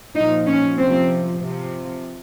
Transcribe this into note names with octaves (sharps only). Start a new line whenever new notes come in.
A#2 F3 D#4
C#4
C3 F3 C4
C3 F3